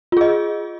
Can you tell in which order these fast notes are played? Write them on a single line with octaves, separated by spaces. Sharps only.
F4 G#4 D#5